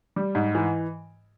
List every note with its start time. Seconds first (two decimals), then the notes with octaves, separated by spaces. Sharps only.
0.16 G3
0.35 G#2
0.55 E3